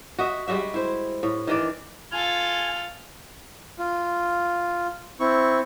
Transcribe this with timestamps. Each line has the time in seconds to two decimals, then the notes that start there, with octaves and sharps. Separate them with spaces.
0.19 F#4 D#5 E5
0.48 G3 G#3 F#4 E5
0.74 E4 C5
1.23 A2
1.47 D#3 E3 D5
2.12 F4 A4 G#5 F6
3.79 F4
5.20 C4 E4 C#6